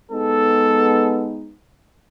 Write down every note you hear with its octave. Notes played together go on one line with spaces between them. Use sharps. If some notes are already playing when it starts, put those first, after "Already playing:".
G#3 B3 D#4 A4